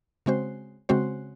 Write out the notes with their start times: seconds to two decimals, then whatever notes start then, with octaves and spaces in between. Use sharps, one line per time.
0.26 C#3 G#3 C4 F#4 C5
0.89 C#3 G#3 C4 F#4 C5